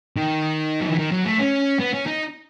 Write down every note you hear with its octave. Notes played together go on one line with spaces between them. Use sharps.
D#3
F#3
E3
D#3
F#3
A3
C#4
B3
C#4
D#4